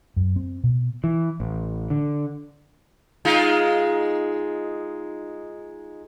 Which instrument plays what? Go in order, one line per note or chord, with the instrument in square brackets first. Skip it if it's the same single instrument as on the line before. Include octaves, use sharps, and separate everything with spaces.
[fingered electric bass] F#2
C4
B2
E3
A1
D3
[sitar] G#3 D#4 F4